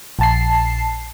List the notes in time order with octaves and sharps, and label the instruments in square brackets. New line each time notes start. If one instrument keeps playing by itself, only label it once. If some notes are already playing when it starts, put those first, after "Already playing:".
[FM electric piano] A#1 A5 C7